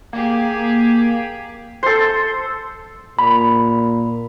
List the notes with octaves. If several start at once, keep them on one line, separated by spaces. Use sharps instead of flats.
A#3 G4 G#4
A4 C5
A#2 B5